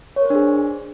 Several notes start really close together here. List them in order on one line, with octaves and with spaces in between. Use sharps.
C#5 A#4 C5 D4 G#4